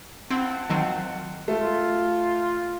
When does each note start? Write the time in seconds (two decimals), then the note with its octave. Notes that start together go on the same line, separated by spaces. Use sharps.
0.30 C4 E4 F4 F#5 A5
0.70 D#3 F#3 C4
1.48 A3 F4